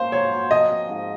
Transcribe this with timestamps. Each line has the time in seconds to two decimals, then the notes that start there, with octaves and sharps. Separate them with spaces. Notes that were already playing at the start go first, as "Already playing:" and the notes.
Already playing: A#3 C#4 C5
0.12 F#3 C#5
0.32 F4
0.51 F3 D#5
0.69 C4
0.89 G#2